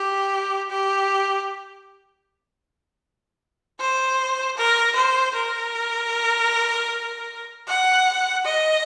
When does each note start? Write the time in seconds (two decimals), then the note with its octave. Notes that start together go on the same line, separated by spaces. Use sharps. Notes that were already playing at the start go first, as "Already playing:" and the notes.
Already playing: G4
0.70 G4
3.80 C5
4.58 A#4
4.96 C5
5.35 A#4
7.67 F#5
8.45 D#5